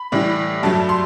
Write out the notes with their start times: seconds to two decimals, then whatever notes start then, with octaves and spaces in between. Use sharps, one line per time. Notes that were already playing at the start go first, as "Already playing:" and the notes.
Already playing: B5
0.12 A2 E3 G3
0.63 G2 F#3 A3 A5
0.89 C6